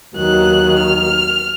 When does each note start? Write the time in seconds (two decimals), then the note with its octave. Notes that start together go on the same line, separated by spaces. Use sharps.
0.15 D#2 D#3 F#3 F#6
0.80 F6